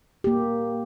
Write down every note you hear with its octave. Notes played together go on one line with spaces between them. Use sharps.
A#3 G4